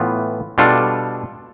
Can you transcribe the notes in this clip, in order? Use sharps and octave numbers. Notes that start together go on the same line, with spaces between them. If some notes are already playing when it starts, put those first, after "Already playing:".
Already playing: A2 E3 B3 F4
B2 G3 D4 F4 A4